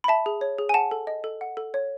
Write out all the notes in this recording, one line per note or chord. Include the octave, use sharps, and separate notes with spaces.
B5
E5 A5
G#4
C#5
G#4
G#5
F#5 A5
A4
D#5
A4
F#5
A4
C#5